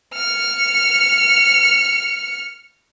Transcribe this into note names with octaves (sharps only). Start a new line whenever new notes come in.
F6 C#7